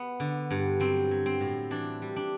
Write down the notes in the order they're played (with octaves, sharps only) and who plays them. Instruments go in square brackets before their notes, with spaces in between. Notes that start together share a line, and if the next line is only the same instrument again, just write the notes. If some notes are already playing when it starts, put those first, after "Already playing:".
Already playing: [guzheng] B3
D3
G2
F#3 C4
F#3
C4
A2
E3 D4
G3
D4